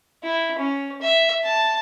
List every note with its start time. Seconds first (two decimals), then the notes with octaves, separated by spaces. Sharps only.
0.23 E4
0.58 C#4
1.02 E5
1.43 A5